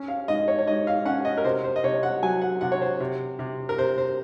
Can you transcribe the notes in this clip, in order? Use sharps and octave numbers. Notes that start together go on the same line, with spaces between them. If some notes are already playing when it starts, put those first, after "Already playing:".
Already playing: C#4
F5
G#2 D#5
C#5
C#5
G#2 D#5
F5
C#4 F#5
D#5
A#4
C3 C5
C5
D#5
C3 C#5
F#5
F#3 G#5
F#5
C3 F#5
C#5
C5
C3
C3
A#4
C3 C5
C5